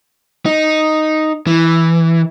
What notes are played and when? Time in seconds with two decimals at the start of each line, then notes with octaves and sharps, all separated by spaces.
0.46 D#4
1.47 E3